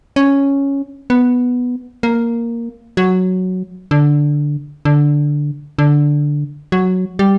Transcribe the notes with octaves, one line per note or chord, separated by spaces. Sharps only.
C#4
B3
A#3
F#3
D3
D3
D3
F#3
G3